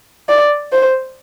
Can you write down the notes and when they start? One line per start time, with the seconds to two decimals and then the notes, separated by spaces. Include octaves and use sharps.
0.29 D5
0.73 C5